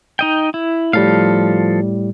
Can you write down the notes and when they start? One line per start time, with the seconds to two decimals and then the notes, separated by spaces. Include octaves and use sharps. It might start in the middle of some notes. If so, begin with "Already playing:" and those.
0.19 D#4 D#5 G5
0.54 E4
0.93 A2 F3 G3 A4 F5